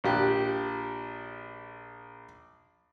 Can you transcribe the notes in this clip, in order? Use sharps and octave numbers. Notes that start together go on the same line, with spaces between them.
A#1 G4 F#6